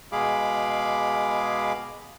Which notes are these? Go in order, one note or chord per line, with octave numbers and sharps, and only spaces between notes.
B2 G#3 G#4 F5 B5 D6